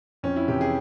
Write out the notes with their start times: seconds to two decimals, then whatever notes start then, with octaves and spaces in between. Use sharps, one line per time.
0.23 F2 C#4
0.36 E4
0.48 C3 E3 G4
0.61 G#4